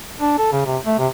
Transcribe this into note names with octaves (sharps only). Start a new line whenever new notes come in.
D4
A4
C#3
C3
A3
C3